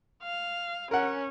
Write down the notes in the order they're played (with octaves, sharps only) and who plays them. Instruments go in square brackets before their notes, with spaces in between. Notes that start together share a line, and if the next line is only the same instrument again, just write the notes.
[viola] F5
[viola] C#4 [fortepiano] A#4 F#5